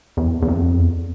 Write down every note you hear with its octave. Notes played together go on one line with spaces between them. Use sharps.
E2
E2
F2
E2